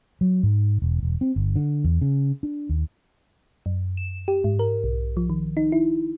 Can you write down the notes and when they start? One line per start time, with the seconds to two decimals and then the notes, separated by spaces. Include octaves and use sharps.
0.21 F#3
0.43 G#2
0.82 E1
1.03 E1
1.21 C4
1.36 G1
1.56 D3
1.84 E2
2.01 C#3
2.43 D4
2.69 D#2
3.66 F#2
3.97 E7
4.28 G4
4.44 G#2
4.59 A#4
4.84 B1
5.17 F3
5.30 D#3
5.57 D#4
5.72 E4